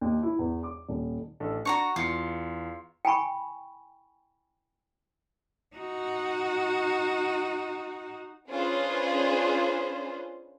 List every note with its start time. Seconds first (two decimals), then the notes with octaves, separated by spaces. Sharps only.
0.01 D#2
0.23 E4
0.39 E2
0.63 D6
0.88 D#1
1.40 A1 D4 A4
1.65 D4 F#4 A#5 C#6
1.96 E2 F4 C#7
3.05 G5 G#5 B5 C#6
5.76 D#4 F#4
8.50 C#4 D4 F4 G#4 B4 C5